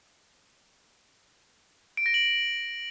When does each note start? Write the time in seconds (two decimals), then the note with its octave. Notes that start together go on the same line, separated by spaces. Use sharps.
1.97 D7
2.06 A#6
2.14 F#7